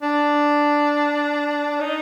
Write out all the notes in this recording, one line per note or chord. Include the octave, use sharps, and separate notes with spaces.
D4
D#4